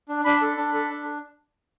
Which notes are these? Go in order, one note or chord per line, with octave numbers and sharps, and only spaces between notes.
D4
D4 B5
A4
D4
A4
D4